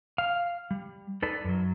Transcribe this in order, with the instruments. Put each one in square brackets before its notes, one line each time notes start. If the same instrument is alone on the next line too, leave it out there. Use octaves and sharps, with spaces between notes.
[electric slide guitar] F5
G3
D#4 A4 B4 D5
F#2 F#3